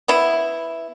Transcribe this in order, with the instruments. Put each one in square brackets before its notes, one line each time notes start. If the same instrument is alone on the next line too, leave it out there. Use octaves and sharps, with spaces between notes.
[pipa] B3 E4